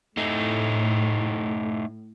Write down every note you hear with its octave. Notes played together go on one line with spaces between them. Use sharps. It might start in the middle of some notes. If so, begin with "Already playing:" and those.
A2 A3 D#4